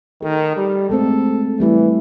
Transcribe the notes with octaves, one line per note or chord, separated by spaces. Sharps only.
D#3 A4
G3
G#3 A3 C4 A4
E3 G3 A3 E4